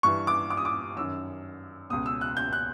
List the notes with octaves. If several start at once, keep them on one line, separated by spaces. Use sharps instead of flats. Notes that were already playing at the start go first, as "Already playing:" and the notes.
G2 E3 C#6
D6
D6
D#6
D6
F#2 D#3 E6
C#2 B2 D#6
E6
F#6
G6
F#6